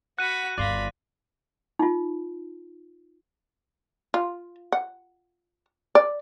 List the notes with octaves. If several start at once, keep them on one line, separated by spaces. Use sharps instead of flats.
F#4 F#5 B5 F#6 D#7
G1 D#2 D5 F5 B5 C6 A#6
D#4 F4
F4
F#5
D5